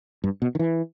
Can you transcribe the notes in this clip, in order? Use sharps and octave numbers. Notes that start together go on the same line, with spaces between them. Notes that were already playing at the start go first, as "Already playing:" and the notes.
G2
B2
D#3
E3